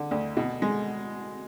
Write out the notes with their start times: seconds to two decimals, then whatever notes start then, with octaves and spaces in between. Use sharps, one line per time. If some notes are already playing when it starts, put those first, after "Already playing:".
Already playing: D3
0.11 D2
0.37 B2
0.62 G#3